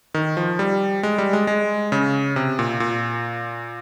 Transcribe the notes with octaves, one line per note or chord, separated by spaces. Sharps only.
D#3
F3
G3
G#3
G3
G#3
G#3
C#3
C3
A#2
A#2